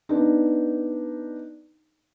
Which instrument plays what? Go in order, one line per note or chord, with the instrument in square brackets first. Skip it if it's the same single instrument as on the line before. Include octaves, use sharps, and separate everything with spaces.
[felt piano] B3 D4 D#4